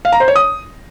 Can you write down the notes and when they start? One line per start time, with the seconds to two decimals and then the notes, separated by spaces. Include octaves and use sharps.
0.05 F5
0.12 A#5
0.20 C5
0.28 C#5
0.36 D#6